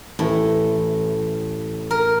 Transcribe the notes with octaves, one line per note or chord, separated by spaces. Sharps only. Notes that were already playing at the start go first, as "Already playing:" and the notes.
A1 A2 E3
A#4